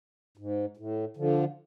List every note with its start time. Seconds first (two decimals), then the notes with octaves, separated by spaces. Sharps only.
0.38 G#2
0.77 A2
1.17 D3 F3